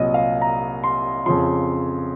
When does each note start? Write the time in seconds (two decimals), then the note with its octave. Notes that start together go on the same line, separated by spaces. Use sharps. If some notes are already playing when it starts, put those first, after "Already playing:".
Already playing: C2 A#2 F#3 D#5
0.14 F5
0.42 A#5
0.84 C6
1.26 F2 C#3 F3 C6